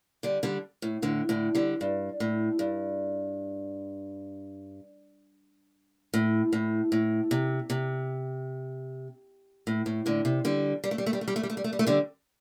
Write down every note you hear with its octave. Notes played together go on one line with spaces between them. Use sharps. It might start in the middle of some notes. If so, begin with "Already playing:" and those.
D3 G3
D3 G3
A2
A2 D3
A2 D3
D3 G3
G2
A2
G2
A2
A2
A2
C3
C3
A2
A2
A2 D3
C3
D3 G3
G3
A3
G3
A3
G3
A3
G3
A3
G3
A3
G3
A3
G3
A3
D3 G3